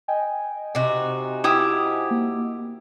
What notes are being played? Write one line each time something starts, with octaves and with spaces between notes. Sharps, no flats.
D#5 G5 G#5
C3 D#4 F#4
E4 G4 D#6
A#3